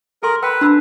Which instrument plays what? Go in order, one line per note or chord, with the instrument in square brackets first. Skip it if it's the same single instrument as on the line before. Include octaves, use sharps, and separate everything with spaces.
[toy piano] A4 G#5 C6 [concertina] A#4
[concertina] B4 [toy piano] G5 B5 [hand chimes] E6
[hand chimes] D4 [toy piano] D#4 B5 E6